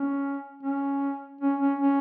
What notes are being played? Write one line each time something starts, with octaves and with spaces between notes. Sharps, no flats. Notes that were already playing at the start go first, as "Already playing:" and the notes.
Already playing: C#4
C#4
C#4
C#4
C#4